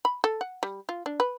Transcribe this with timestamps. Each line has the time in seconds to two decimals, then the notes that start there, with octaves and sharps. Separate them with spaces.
0.05 B5
0.24 A4
0.41 F#5
0.63 G3
0.89 F4
1.06 D4
1.20 B4